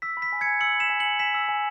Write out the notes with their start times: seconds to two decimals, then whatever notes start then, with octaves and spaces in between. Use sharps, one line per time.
0.02 E6 B6
0.17 B5
0.22 B6
0.32 G#5
0.41 G#6 C#7
0.46 G#5
0.61 E6 C#7 F#7
0.76 B5 B6 E7
0.90 G#5
1.00 C#7 F#7
1.05 G#5
1.19 G#5 B6 E7
1.34 E6
1.49 G#5